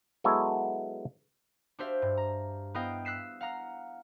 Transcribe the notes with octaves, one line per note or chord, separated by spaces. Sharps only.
F#3 G#3 B3 E4 A4 C#5
D4 F#4 G4 C5 E5 F5
G2
A#5
B3 E4 A#4 D#5 F5 G5
E6 F#6 B6 C7 E7
F5 F#5 A#5 F6